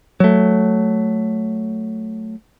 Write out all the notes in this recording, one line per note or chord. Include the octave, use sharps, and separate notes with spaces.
F#3 A3